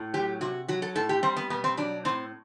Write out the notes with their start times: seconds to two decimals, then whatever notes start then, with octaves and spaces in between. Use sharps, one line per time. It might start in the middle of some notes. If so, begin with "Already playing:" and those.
Already playing: A2
0.14 F#3 G4
0.41 C3 F#4
0.68 F#3 F#4
0.82 A4
0.95 A2 A4
1.09 G4
1.23 G3 C4
1.36 B3
1.50 B2 B3
1.64 C4
1.77 F#3 D4
2.05 A2 C4